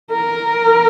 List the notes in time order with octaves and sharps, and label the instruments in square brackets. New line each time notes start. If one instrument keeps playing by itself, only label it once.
[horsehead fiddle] A#4